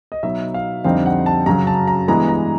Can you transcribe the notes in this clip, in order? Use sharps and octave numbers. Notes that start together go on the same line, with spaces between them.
D#5
B2 F#3 B3 D#4 E5
F5
F2 D3 G3 C4 D#4 F5
F#5
A5
F#2 C#3 F#3 A#5
A5
A#5
G2 E3 G#3 B3 A#5
A#5